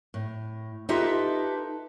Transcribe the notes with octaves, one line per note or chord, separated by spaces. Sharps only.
A2
D#4 F4 G4 A4 B4 E5